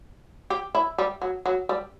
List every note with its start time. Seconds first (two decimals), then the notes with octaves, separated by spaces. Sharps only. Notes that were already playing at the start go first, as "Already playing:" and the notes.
0.50 G4
0.75 E4
0.98 G3
1.21 F#3
1.46 F#3
1.69 G3